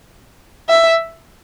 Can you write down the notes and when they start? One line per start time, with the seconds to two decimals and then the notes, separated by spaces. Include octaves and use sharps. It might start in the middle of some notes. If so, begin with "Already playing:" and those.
0.69 E5